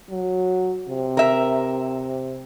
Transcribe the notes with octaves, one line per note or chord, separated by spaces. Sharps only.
F#3
C3
A#4 E5